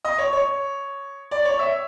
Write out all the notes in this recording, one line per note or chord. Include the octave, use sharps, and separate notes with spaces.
D#5
C#5
C#5
D5
C#5
E5